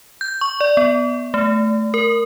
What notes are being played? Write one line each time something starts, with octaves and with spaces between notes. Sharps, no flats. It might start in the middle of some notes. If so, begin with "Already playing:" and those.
G6
C#6
D5
B3
A3
A#4